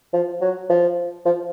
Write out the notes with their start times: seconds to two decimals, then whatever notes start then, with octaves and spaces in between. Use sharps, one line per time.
0.14 F3
0.42 F#3
0.70 F3
1.26 F3